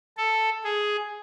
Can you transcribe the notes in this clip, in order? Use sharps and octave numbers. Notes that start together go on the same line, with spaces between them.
A4
G#4